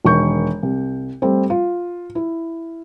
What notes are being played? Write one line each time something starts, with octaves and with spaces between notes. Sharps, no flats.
E1 D#3 C#6 G6
C2
G3 A3 C4
F4
E4